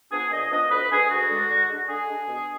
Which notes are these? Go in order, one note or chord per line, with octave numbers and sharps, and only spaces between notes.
F3 B3 D4 G#4
A#2 D#5
F3 B3 D4 D#5
D2 B4
D3 G#3 D4 G#4
D2 F#4
D3 G#3 D4
D3
G#3 D4
D3 G#4
G#3 D4
B2